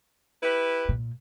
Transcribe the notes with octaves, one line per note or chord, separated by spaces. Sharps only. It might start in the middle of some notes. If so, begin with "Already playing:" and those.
E4 G4 B4
A#2